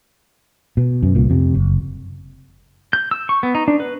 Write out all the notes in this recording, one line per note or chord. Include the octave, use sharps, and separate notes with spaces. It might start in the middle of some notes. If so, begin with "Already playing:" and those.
B2
F#2
C2 A#2
F2 C3
F#1
G6
E6
C#6
B3
D#4
D4
B4